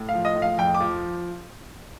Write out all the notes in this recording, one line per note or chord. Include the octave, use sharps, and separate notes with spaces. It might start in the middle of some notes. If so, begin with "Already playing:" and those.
Already playing: A2
F5
F3
D#5
A2
F5
F2 G5
D6
F3